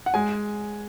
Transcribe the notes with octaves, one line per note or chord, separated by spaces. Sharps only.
F#5
G#3 G#5